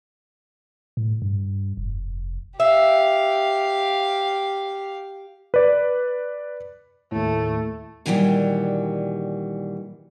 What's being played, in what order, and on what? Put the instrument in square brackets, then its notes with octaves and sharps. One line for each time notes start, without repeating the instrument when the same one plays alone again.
[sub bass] A2
G2
F1
[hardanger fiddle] G4 F5 [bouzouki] E5
[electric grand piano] B4 D5
[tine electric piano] D#2 A2 [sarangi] A3
[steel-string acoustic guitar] A#2 D#3 E3 F#3 G3